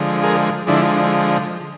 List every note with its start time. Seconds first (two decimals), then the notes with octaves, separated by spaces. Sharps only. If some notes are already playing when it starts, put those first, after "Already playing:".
Already playing: D3 F3 G#3
0.23 G#4 A#4
0.67 D3 F3 G#3 D4 E4